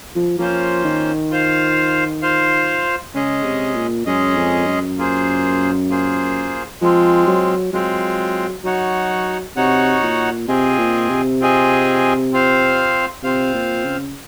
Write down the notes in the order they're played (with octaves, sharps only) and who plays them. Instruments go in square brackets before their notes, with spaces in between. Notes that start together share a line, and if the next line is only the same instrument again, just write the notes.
[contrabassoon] F3
[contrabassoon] F3 [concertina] A#3 C#4 F4 C5
[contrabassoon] D#3
[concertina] F4 C5 F5
F4 C5 F5
[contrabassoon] C#3 [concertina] G#3 C#4 G#4 D#5
[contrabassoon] C3
A#2
[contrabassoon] F#2 [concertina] G#3 C#4 G#4 D#5
[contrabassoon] F2
F#2
[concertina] A#3 F4 G#4 C5
A#3 F4 G#4 C5
[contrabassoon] F3 [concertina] G#3 C4 F4
[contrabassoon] F#3
[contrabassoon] F#3 [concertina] G#3 C4 F4
[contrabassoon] F#3 [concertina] D#4 F#4 C#5 F#5
[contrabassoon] C3 [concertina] D#4 F#4 C#5 F#5
[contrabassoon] A#2
[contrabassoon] C3 [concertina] C4 F4 G#4 D#5 G#5
[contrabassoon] A#2
C3
[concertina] C4 F4 G#4 D#5 G#5
C4 F4 C5 F5
[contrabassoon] C3 [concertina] C4 F4 C5 F5
[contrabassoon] A#2
C#3